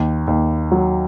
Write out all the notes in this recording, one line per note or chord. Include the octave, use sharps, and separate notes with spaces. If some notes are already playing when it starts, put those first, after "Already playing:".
Already playing: D#2
D#2
F#3